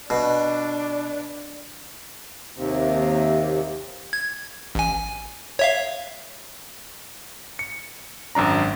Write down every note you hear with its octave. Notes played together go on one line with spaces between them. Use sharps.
B2 D4
D#2 C3
G#6
A1 G#5
C#5 E5 F5
C#7
G#1 F#2 D4 A#5